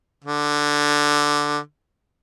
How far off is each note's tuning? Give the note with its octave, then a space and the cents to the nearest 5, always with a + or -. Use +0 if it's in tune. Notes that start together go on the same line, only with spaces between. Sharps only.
D3 +0